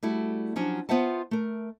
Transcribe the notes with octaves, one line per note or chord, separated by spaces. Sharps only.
G3 A3 E4 F#4
F3 F#3 C#4 D4 F#4
B3 F4 C5 E5 F#5 A5
A3 A#4